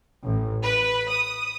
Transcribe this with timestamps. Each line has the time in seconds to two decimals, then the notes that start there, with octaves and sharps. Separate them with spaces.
0.24 A1
0.63 B4
1.11 D#6